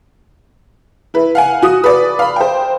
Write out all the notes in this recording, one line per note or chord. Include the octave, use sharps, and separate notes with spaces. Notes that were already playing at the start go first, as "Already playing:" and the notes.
E4 B4
F5 F#5 G#5
F#4 D#6
B4 D5
F5 B5
C5 G5